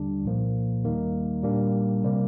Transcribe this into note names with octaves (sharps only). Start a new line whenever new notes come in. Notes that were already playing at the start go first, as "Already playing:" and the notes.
Already playing: D#2 D3 G3 D4
C2 A#2 F3 A#3
D#2 D#3 G3 A#3 D#4
A#2 G3 A#3 D4
C3 G3 A#3